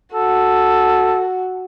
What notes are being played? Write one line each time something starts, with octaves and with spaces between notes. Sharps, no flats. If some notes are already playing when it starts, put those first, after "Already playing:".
F#4 A4